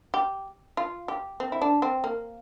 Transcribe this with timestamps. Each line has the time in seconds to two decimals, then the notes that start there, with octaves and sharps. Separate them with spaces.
0.14 G4
0.77 F4
1.08 G4
1.40 C4
1.52 E4
1.62 D4
1.82 C4
2.04 A#3